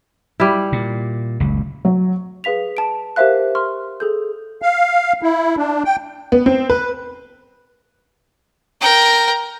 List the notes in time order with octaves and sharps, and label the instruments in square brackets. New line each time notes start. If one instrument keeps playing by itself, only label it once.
[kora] G3 E4
[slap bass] A#2
F#1 C#2
[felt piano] F#3
[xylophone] G#4 B4 F5 B6 F7
A5 D7
G4 A#4 C5 E5 F5 F#6
C6 C#6 F6
G#4 A4 G6
[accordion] F5
E4
D4
G5
[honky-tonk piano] B3
C4
B4
[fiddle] A#4 G5